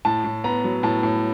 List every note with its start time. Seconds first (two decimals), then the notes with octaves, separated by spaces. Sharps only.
0.05 A2 A5
0.24 A2
0.44 B3 A#5
0.64 F#3
0.83 A2 A5
1.03 A2